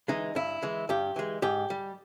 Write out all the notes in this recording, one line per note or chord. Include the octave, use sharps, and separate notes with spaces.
E3 G#3 D#4
G2 E4
E3 G#3
G2 G4
E3 G#3
G#2 G4
G3